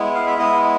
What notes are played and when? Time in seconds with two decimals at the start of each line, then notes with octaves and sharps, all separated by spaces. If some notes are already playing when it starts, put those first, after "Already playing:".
Already playing: G#3 B3 E4
0.15 F5
0.27 E5
0.38 G#3 B3 E4 D#5